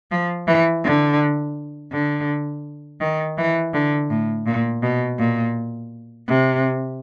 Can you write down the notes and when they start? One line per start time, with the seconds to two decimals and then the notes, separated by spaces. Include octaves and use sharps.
0.11 F3
0.47 E3
0.84 D3
1.92 D3
3.01 D#3
3.38 E3
3.74 D3
4.10 A2
4.46 A#2
4.83 B2
5.19 A#2
6.28 C3